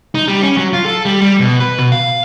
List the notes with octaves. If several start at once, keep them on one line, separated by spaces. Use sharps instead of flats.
D#4
G3
C#4
F#3
F4
A4
G3
G3
B2
B4
B2
F5